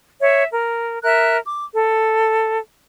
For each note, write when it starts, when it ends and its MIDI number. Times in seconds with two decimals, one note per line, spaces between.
0.21 0.44 73
0.21 0.44 76
0.51 0.98 70
1.03 1.38 70
1.03 1.38 76
1.03 1.38 90
1.44 1.62 86
1.74 2.57 69